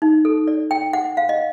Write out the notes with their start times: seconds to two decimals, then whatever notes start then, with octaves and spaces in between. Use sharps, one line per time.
0.02 D#4
0.25 A4
0.48 D5
0.71 G5
0.93 F#5
1.17 F5
1.29 D#5